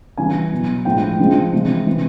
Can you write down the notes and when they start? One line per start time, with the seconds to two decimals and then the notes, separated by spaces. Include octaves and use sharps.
0.17 C#3 E3 G3 G#5
0.52 B2 F#3
0.85 A2 F3 G#3 G5
1.19 C#3 F3 G#3
1.53 C3 E3 G#3
1.87 C3 E3 G#3